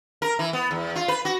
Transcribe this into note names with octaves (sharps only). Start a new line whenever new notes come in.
A#4
E3
B3
E2
F4
B4
F#4